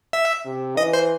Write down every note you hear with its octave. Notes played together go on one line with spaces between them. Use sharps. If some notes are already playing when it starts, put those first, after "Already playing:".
E5
C3
E3 D#5
C5